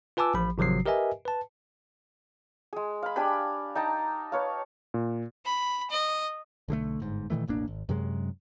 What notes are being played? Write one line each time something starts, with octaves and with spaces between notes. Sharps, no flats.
F4 B4 G#5 A5 D6 E6
A1 F3 B5
G#1 C3 F3 F#3 C7
G4 A#4 B4 D#5 E5 G#5
B4 A5
G#3 G#4
F5 B5
D4 G4 G#5 B5
D#4 G5 A5 A#5
B4 C#5 F5
A#2
B5
D#5
B1 D3 F#3 A3
G1 G#2
A#2 D#3 E3 A3
E1 A1 A#3 D4
G#1
F#2 C3 F#3 G#3